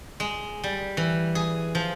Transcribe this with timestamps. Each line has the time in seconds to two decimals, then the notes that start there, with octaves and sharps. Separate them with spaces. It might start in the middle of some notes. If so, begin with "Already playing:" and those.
0.20 G#3
0.64 G3
0.97 E3
1.35 G#4
1.75 F3